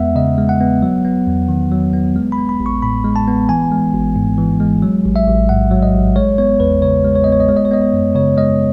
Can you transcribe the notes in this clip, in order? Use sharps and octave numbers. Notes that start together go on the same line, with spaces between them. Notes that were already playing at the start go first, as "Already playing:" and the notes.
Already playing: E2 G#3 B3 E5 F#5
C#3 D#5
G#3
F#5
B3
F#3
B3
E2
D#3
F#3
B3
G#3
B5
B3
B5
A1
C#6
A2 B5
G#3
A5
B3
E3 G#5
G#3
G#1
G#2
E3
G#3
F#3
A1
E5
A1
G#2 F#5
F#3
D#5
A1
G#3 C#5
B3 C#5
E2 B4
C#3 C#5
G#3
C#5
B3 D#5
C#5
D#5
G#3 C#5
D#5
C#5
B3 D#5
C#5
F#2
C#3 C#5
G#3 D#5